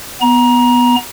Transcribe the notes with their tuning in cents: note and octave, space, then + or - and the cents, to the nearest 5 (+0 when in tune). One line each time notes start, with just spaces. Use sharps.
B3 +0 A#5 +25